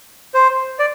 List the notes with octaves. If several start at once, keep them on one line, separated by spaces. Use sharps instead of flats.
C5
D5